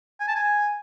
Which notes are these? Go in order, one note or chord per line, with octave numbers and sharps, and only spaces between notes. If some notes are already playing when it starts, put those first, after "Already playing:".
G#5
A5
G#5